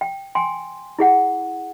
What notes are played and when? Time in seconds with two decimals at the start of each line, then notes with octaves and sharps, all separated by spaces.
0.01 G5
0.35 G5 G#5 C6
0.99 E4 G#4 F#5